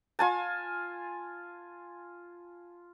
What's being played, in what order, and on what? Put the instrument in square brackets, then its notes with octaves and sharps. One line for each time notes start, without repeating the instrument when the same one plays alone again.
[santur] F4 G#5 A5